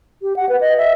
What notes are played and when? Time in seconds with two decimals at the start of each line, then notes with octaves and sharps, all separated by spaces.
0.22 G4
0.36 F#5
0.49 B4
0.61 D#5
0.78 E5